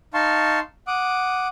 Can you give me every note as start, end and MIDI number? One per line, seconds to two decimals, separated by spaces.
0.14 0.59 63
0.14 0.59 77
0.14 0.59 81
0.14 0.59 84
0.14 0.59 85
0.87 1.48 78
0.87 1.48 86
0.87 1.48 87